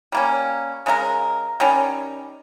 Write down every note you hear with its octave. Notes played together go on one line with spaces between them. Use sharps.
G3 A#3 C#4
C#3 G#3 D#4 A#4
D#3 G3 C#4